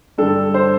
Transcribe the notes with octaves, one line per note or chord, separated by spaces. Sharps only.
G2 D3 A4
C5